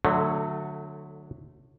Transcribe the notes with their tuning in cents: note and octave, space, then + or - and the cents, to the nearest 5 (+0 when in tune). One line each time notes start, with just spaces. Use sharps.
D3 +15 F#3 -15 A3 +0